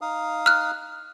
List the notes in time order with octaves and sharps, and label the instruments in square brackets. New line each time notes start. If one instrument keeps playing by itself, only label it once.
[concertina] D#4 F5 D#6
[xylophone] F6 F#6